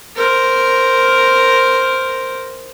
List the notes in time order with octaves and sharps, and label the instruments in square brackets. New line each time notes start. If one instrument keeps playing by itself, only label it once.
[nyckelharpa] A#4 C5